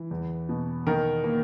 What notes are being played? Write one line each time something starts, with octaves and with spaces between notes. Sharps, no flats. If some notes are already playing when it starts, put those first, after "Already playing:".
Already playing: E3
E2
B2
D#3 A#4
A#3